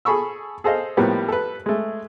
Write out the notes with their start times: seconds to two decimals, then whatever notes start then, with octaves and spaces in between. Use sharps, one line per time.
0.05 G#4 A4 B5 C#6 E6
0.64 G#4 A4 C5 D#5 F5
0.97 A2 F3 G3 A#3 B3
1.28 A4 B4
1.66 G#3 A3